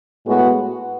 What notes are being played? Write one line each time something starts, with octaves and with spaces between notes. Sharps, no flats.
A2 G#3 B3 F#4